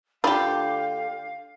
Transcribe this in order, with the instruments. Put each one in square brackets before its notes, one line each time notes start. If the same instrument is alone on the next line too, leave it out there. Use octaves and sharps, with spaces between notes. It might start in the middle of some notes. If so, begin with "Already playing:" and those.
[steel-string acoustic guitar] D2 A4 [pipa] D3 G4 [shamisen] D4 F4 B5 [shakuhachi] F5